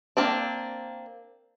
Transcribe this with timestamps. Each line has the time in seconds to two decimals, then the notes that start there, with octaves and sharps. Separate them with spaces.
0.17 A#3 C4 D4